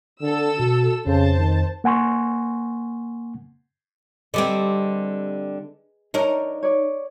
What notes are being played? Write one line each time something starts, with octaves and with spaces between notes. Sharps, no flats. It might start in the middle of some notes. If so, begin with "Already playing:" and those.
D3 A4 E6
B2 F#4
F2 C#3 C5 A5
D#3
A#3 F#5 G#5 C6 C#6
D3 G3 C4 G#4 B4 D#5
D4 D#4 A#4 C#5 D5
C#5 D5